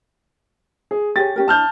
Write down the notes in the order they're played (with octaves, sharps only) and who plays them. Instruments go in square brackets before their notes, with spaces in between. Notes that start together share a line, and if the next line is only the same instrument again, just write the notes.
[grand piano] G#4
[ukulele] G4 G#4 C#5 [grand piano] A6
[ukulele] C#4 G4 A#4
[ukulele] D4 E4 [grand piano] A5 F6 G6